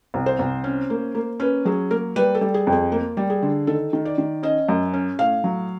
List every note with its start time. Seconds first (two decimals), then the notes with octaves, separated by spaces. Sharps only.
0.14 C2
0.26 C5
0.39 C2
0.64 C#4
0.90 A#3
1.15 A#3
1.40 C#4 B4
1.65 F#3 G#4
1.91 A#3 A#4
2.16 G3 B4
2.35 A4
2.41 G3
2.54 G#4
2.67 F2
2.72 G#4
2.92 A#3
3.17 G3
3.30 G#4
3.42 D3
3.67 D#3 A4
3.93 D#3
4.05 D5
4.18 D#3
4.43 C#4 D#5
4.69 F#2
4.93 C#4
5.19 A2 F5
5.44 F#3